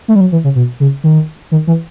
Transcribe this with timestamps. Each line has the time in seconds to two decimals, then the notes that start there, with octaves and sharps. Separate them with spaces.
0.08 A3
0.15 G3
0.20 F#3
0.32 E3
0.44 C#3
0.55 B2
0.80 C#3
1.04 D#3
1.52 D#3
1.67 E3